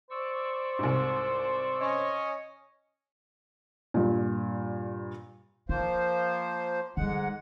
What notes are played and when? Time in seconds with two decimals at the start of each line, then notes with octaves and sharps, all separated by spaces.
0.10 C5 D5 C#6 E6
0.79 C2 G#2
1.81 C#4 C#5 D#5
3.94 G2 A#2
5.69 F3 A#3 F4 C5
6.97 G#2 D3 G3 G#3 F#5